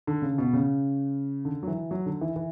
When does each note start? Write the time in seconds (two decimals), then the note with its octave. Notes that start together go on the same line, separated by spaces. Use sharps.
0.07 D3
0.22 C#3
0.38 B2
0.53 C#3
1.45 D3
1.63 F#3
1.67 E3
1.91 F#3
2.06 D3
2.21 E3
2.36 E3